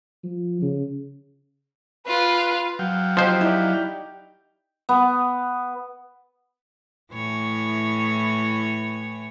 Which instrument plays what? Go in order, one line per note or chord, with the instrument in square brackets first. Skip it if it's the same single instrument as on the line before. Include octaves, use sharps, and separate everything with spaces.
[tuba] F3
C#3
[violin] F4 [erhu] B4
[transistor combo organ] F#3 F5 G5
[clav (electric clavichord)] F3 C5 [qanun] D#4 G4
[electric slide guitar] E4 D5 [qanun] G4
[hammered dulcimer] B3
[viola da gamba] A2 E3 C#5